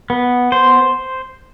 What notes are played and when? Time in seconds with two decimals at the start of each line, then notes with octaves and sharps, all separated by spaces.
0.10 B3
0.52 C5